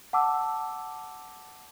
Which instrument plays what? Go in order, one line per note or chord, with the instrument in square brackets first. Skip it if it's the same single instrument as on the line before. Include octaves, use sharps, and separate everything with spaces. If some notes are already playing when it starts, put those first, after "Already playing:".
[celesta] F#5 A5 D6 E6